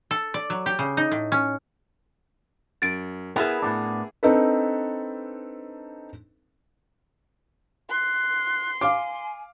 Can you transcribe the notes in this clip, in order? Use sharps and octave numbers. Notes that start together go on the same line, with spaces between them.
A4
D5
F#3
G4
C#3
D#4
A2
C#4
F#2 A6 D7
B3 E4 G#4 A#4 B4 E5
A2 B3 D4
C4 D4 D#4 A4 B4
C6 F#6
F5 G#5 D6